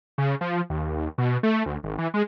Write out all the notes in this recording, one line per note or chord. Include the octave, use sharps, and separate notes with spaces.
C#3
F3
D#2
B2
A3
D2
G#1
E3
G#3